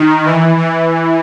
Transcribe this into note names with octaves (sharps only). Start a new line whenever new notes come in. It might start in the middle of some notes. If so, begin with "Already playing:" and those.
Already playing: D#3
E3
E3